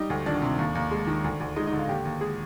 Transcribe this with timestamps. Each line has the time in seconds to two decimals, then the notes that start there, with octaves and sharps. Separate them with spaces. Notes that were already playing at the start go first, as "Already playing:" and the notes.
Already playing: G3 D#4
0.10 D2
0.26 D#3 D4
0.42 C3
0.59 D#2
0.75 D#2
0.91 G#3
1.07 D#3
1.24 D2
1.40 D2
1.56 G#3 D#4
1.67 D#4
1.73 D3
1.78 F4
1.89 D#2 G4
2.05 D#2
2.21 G#3 G#4